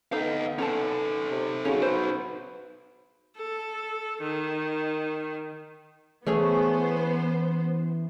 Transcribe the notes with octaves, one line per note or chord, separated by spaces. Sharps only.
B3 D#4 A4 B4 D#5 F5
C#4 D#4 A4 A5
C3
C#3 C#4 D#4 F#4
B4 C5
A4
D#3
E3 A3 B3 C#4 G#4 C5